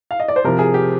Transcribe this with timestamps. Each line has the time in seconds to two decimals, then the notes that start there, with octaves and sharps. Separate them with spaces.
0.11 F5
0.20 D#5
0.28 D5
0.36 C5
0.44 C3 F3 A#4
0.59 G#4
0.74 G4